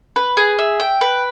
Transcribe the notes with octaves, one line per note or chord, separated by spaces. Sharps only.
B4
G#4
E5
G5
B4